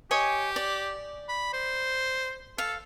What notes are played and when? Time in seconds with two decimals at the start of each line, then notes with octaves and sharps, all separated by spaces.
0.11 G4 C#5 D#5 G#5
0.56 D5
1.28 B5
1.53 C5
2.58 A4 F5